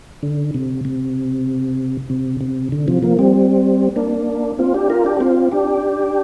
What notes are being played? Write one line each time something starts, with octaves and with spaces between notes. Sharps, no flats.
D3
C3
C3
C3
C3
D3
C3 F3
F3 A#3
G3 C4
A#3 D4
C4 F4
D4 G4
F4 A#4
D4 G4
G4
C4 F4
D4 G4